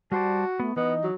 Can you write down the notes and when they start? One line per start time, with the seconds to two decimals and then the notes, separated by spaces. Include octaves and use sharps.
0.12 G3 F#4 C5 D5 A5
0.60 A3 B3
0.76 E3 B3 D#4 D#5
1.03 F#3